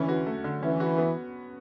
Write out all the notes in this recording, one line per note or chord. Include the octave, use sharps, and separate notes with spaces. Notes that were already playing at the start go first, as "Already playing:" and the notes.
Already playing: D3 E3 A3 C#4
F#4
A3
D3
E3 C#4
F#4
B3